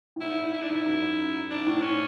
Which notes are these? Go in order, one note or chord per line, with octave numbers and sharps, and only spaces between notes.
A2
G#2 E4
G#2
G#2 E4
D4
G#2 E4
F#2
G#2 D4
A2
G#2
C#4